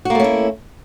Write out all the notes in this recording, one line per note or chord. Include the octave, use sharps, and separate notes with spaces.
A3 A#3 C#4 E4 F#4